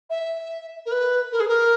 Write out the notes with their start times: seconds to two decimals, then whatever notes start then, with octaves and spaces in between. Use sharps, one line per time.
0.09 E5
0.85 A#4
0.91 B4
1.32 A#4
1.40 G#4
1.47 A#4